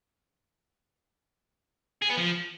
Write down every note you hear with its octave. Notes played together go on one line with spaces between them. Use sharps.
G#4
B3
F3